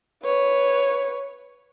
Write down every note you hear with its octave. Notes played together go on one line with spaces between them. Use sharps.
B4 C#5